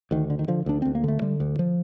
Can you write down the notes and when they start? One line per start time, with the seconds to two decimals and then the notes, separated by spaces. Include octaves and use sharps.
0.11 D2 D#3
0.30 D3
0.39 D#3
0.48 D3 F3
0.66 D2 D4
0.82 D2 C4
0.95 A#3
1.04 D3 A3
1.22 D3 G3
1.40 D2
1.59 F3